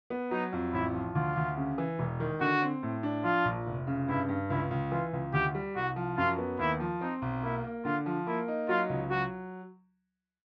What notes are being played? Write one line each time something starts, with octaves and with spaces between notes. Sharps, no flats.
B3
F#3 D#4
F2
A1 E4
F3
D2 F4
D2
C#3
E3
E1
D#3
D3 F#4
C4
A2
D4
F3 F4
A#1
F1
C#3
G2 E4
G2
C#2 E4
C#2
E3 F4
C#2
D2 G4
G3
C2 F#4
F3
F#2 F4
B3
D#2 E4
F3
C4 D#4
B1
A#3 E4
A#3
D3 F4
F3
A#3 E4
D#4
F#3 F4
C#2
F#3 F#4